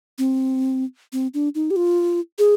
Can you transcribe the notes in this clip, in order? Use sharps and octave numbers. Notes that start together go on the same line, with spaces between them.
C4
C4
D4
D#4
G4
F4
G#4